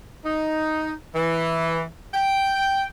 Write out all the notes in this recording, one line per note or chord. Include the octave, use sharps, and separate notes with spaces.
D#4
E3
G5